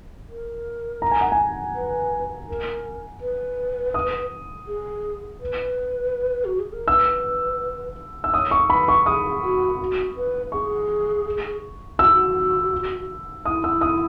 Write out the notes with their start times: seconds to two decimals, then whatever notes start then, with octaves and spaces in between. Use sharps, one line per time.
0.29 A#4
1.02 A#5
1.11 G#5
1.21 F#5
1.32 G#5
1.75 B4
2.48 A#4
3.21 B4
3.94 D#6
4.67 G#4
5.40 B4
6.45 F#4
6.59 G#4
6.73 A#4
6.87 B4 E6
8.24 E6
8.33 C#5 D#6
8.51 C#6
8.69 B4 B5
8.88 C#6
9.06 G#4 D#6
9.43 F#4
9.79 F#4
10.17 B4
10.52 G#4 C#6
11.99 F#4 E6
12.06 E4
12.13 F#4
13.45 E4 D#6
13.64 E6
13.81 D#6